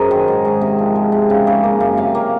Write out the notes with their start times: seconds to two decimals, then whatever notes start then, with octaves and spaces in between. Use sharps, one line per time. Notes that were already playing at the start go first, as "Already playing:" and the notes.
Already playing: F#2 G#4 A#4 C5 D#5
0.11 D#3
0.28 G#2
0.45 G#2
0.61 C3
0.79 F3
0.95 G#3
1.12 C3
1.30 C#3
1.47 C#3
1.64 A#3
1.80 F#2
1.97 C3 F5
2.15 A#3